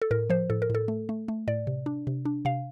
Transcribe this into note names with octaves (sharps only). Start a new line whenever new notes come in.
A4
A2 A#4
F3 C5
A2 A4
A#4
A2 A4
A3
A3
A3
A2 D5
C3
D4
C3
D4
C3 F5